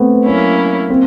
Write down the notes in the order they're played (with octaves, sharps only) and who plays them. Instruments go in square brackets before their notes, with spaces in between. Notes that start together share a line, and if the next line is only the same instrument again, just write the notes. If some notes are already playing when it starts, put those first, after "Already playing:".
Already playing: [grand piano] A3 B3 C4
[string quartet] F#3 A#3 C#4 E4
[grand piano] A#3 C4